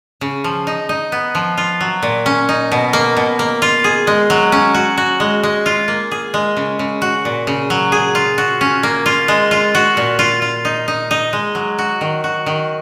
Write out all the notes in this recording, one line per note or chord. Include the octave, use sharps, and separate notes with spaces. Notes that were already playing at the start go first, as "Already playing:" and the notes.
C#3
F3
D#4
D#4
B3
F3
F4
F#3
A#2
C#4
D#4
B2
A#3
B2
A#3
F4
G#4
G#3
F#3
C#4
F#4
F#4
G#3
G#3
F4
A#3
G#4
G#3
C#3
C#3
F#4
A#2
C#3
F#3
G#4
F4
F#4
C#4
A#3
F4
G#3
F4
F#4
A#2
F4
F4
D#4
D#4
D#4
G#3
F#3
F#4
D#3
F#4
D#3